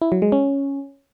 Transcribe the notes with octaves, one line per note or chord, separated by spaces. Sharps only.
E4
F#3
G#3
C#4